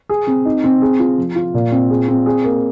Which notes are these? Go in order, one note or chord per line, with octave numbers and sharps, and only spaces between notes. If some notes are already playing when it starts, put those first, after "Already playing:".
G#4
C4
D#4
C4
G#4
F4
F3
F4
A#2
C4
G#4
C4
G#4
A#3